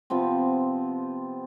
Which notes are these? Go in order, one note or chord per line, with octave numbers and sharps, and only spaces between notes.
C3 F3 B3 C4